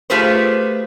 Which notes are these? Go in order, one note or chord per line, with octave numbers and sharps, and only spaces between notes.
A3 F4 G4 G#4 B4 C5